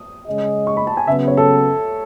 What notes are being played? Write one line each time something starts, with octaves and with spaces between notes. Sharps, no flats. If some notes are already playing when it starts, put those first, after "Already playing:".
Already playing: D#6
C#3 G#3 C#4 G#4 D#5
C#6
B5
A5
G#5
C#3 F#3 B3 E5
C#5
A4